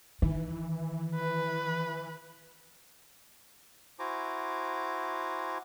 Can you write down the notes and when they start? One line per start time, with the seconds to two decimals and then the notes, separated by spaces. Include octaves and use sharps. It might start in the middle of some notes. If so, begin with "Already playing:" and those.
0.22 D#3 E3
1.15 B4
3.99 E4 F#4 C5 G#5 A#5 D6